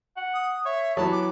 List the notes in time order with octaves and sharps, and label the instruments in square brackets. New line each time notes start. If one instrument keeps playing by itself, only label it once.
[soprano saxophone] F#5
[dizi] D#6
[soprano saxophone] C#5 [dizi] E5
[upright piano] E3 F#3 [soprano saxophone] B3 [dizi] A5
[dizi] D6